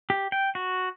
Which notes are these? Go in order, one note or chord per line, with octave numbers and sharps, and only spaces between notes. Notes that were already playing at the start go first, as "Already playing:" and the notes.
G4
G5
F#4